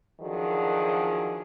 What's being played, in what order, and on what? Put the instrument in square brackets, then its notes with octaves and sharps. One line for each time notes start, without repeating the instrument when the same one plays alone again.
[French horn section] F#2 D3 D#3 F3 F#3 G#4